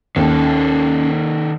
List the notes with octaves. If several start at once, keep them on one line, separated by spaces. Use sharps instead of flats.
D#2 D#3 C#4 A4